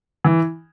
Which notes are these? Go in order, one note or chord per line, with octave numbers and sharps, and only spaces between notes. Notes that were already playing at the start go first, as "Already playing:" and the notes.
E3